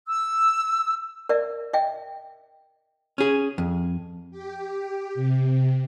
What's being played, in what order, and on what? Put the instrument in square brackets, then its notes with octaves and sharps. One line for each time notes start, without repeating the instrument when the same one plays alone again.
[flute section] E6
[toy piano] A#4 D5 E5
D#5 E5 G5
[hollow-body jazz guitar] C#4 G#4
F2
[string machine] G4
C3